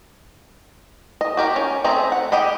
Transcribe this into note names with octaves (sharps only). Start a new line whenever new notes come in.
D#5
F#4 G4 A#4
C#4
A3 C4 G#4 E5 A#5
F#5
G4 D#5 F#5 B5